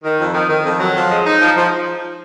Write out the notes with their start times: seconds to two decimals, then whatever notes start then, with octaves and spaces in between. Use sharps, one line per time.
0.04 D#3
0.19 F2
0.34 D#3
0.50 D#3
0.65 F2
0.80 F#3
0.96 F3
1.11 G#3
1.26 D#4
1.41 F3
1.57 F3